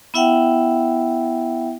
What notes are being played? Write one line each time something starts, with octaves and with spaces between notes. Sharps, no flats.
B3 E4 E5 F#5 G5